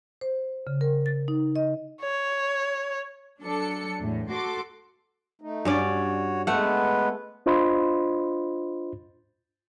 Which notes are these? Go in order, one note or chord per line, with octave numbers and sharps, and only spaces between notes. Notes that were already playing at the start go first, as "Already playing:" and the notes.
C5
C#3
A#4
A6
D#4
D#5
C#5
F#3 D4 A4 C#7
E2 A2
F#4 A4 C6 D6
A3 D#4
G2 C#4 F#4 C#5 D5
G#3 A3 B3 B4 F#5
D4 F4 C5 D#5 B5 C6